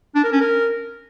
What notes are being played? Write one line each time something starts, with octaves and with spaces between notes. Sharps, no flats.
D4
A#4
C#4
A#4